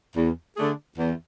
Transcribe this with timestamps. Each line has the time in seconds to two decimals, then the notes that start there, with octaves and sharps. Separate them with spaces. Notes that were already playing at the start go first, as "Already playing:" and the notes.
0.15 E2
0.57 D3 A3 D4 G#4
0.98 E2